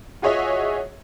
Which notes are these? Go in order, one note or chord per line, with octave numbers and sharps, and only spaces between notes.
F4 F#4 G#4 C#5 D#5 E5